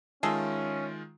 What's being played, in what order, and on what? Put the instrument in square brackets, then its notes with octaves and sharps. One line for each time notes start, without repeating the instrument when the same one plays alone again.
[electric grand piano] D#3 G#3 F4 [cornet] C#4 [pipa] G#4 A4 E5